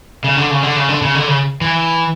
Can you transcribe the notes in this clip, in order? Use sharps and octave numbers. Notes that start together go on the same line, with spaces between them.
C#3
D3
C#3
D3
C#3
D3
C#3
D3
C#3
E3